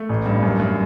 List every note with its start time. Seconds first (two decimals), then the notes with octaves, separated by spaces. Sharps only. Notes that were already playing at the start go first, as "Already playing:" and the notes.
Already playing: A3
0.09 A1
0.26 G2
0.43 F#2
0.60 F#2